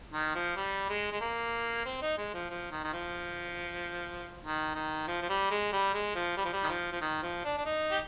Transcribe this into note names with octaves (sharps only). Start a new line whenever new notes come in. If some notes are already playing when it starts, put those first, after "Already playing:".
D#3
F3
G3
G#3
G#3
A#3
C4
D#4
G#3
F3
F3
D#3
D#3
F3
D#3
D#3
F3
F3
G3
G#3
G3
G#3
F3
G3
F3
G3
D#3
F3
F3
D#3
F3
D4
D4
D#4
G4